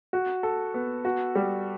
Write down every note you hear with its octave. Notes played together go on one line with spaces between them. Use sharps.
F#4
A4
B3
F#4
G3